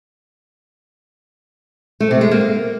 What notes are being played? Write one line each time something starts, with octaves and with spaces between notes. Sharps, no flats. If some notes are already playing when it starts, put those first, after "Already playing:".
A3
C3
G#3
A#3